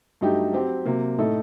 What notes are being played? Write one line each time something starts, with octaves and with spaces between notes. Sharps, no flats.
G2 F#3 A3 D#4 G4
F#3 C4 G4
C3 F#3 A#3
A2 A3 D#4 A4